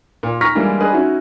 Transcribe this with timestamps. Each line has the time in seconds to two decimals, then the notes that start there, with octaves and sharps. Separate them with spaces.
0.23 A#2
0.41 A#5 C#6 F6 A#6 B6
0.55 E3 G3 G#3 A#3 D4
0.80 D4 G#4 B4 D#5
0.93 C#4 D#4 E4 F#4